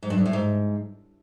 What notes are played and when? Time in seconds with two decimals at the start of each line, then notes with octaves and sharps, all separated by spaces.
0.03 G#2
0.10 G2
0.18 F2
0.26 A2
0.33 G#2